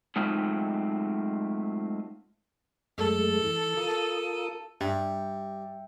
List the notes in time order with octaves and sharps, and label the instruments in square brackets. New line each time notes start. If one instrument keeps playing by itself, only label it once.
[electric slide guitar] F#3 G#3 A3 C4 D#4 F4
[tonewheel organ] F#2 G#3 A3 [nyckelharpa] A4
[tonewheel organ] E3
F4 A#4 D#6
[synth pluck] G2 [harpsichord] G3 [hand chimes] E5 G5